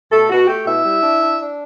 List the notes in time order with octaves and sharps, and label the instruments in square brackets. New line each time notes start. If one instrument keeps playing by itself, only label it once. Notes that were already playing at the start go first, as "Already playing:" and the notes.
[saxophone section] B2 A3 A4
B2 F#4
A3 G4
B2 E4 E5
G3
D4
D4
D4